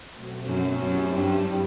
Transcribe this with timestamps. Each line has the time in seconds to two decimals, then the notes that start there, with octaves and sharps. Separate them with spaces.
0.10 B2 F#3 A3 C4 F#4
0.46 F#2
0.79 F#2 F#3 C4 E4 G4
1.14 G2